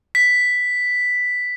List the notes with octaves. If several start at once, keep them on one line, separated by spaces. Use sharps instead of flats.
B6